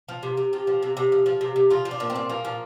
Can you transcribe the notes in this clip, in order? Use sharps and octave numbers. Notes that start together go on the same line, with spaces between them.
F3
C3
C3
F3 G4
F3
C3
C3
F3
F3
C3
C3
F3 F4
F3
D4
A#2
C4
A#2
F3 A#3
F3